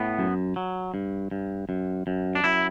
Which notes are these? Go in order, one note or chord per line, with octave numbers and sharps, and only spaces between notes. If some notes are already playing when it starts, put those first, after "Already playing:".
Already playing: A2 B3
F#2
F#3
G2
G2
F#2
F#2
D4
F#2 E4